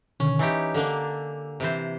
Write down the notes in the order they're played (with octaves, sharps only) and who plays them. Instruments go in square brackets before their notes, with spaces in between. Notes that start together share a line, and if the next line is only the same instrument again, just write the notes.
[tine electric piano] B2 D3 D#3 [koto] C#4
[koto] E3 D#4 G4 [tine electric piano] G#5 E6
[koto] D3 A#3 D4
C3 E3 C5